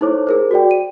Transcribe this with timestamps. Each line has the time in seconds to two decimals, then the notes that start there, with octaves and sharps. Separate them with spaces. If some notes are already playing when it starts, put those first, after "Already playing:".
0.01 D#4 E4 A4 C5 C#5 D6
0.27 G#4 A#4 C5
0.51 F#4 G#4 D5 G5
0.71 D#7